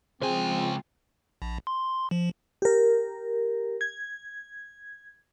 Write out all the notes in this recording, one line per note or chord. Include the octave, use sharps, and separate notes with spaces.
C#2 F3 G#3 C4 F4 G#4 C5 G#5
A#1
C6
F3
G4 A#4
G#6